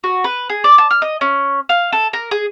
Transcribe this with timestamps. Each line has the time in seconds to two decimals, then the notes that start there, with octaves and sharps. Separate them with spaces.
0.04 F#4
0.24 B4
0.49 G#4
0.64 D5
0.78 A5
0.91 F6
1.02 D#5
1.21 C#4
1.69 F5
1.93 A4
2.13 A#4
2.31 G#4